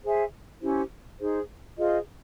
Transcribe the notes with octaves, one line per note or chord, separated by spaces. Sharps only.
G#4 C5 E5 G#5
C#4 E4 G4 C5
D#4 G#4 C5
F4 G#4 C5 D#5